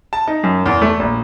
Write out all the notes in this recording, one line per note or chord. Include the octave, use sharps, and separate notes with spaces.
A5
D#4
F#2
E2
A3
A#1